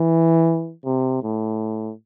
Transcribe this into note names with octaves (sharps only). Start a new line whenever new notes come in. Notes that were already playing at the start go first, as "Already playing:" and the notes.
Already playing: E3
C3
A2